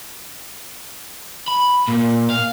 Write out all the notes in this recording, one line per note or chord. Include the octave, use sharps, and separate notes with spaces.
B5
A#2
F5